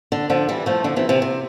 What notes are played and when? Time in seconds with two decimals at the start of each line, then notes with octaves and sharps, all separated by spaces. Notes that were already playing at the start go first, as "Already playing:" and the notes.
0.12 D3
0.30 D3 F3
0.49 E3 G3
0.66 F3 A3
0.84 D3 F3
0.96 C3 E3
1.09 C3 E3
1.22 C3